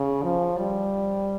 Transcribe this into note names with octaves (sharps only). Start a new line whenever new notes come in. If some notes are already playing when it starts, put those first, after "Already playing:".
Already playing: C#3
F3
G3